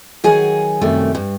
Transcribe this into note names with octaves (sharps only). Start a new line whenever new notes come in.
D#3 F#3 G#4 F#5 G#5
F#2 C3 D#3 G3 A3
G2